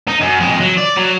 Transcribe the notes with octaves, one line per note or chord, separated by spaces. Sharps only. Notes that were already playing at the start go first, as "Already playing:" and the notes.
D#4
F#2
F2 G#3
F#3
D5
F#3